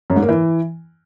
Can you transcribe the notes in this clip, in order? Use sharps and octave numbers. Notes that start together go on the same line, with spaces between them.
F#2
G#2
A#3
E3